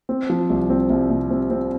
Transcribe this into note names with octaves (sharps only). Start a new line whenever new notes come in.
C4
F3
C2
C4
C2
C3
C4
C4